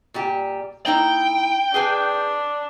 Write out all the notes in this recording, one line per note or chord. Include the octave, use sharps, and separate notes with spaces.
A#2 G3 G4
A#3 D#4 E4 G5
D4 G#4 B4 G#5